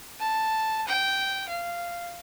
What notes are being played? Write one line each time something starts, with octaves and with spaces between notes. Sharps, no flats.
A5
G5
F5